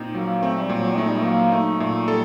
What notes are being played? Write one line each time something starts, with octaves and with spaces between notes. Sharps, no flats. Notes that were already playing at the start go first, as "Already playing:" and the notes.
Already playing: A#2 C4 D#4
F#3 A#3
A3 C4
G3
A#2
F#3
A3 D#4
G3
A3
F#3 A#3
A3 D#4
A#2 A3
G3 A4